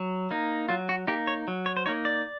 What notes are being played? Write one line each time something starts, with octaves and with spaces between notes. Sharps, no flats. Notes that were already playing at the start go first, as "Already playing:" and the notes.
Already playing: F#3
A#3 D#4
F#3 F4
F#4
A#3 D#4 G4
C#5
F#3
C#5
C5
A#3 D#4 C#5
D5